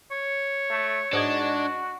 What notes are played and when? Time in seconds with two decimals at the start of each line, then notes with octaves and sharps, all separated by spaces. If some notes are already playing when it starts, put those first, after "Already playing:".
0.11 C#5
0.70 A3
1.13 G#2 D4 F#4 D#5 G#6